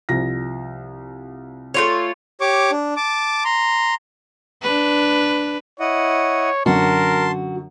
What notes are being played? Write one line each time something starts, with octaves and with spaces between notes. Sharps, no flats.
C2 F3 A#6
A3 F4 C#5
G4 C#5 C#6 D6
D4
A5 D6
A#5 C6
D4 B4
E4 C#5 D#5 F#5
F#2 D3 F#4 A#4 A5 C6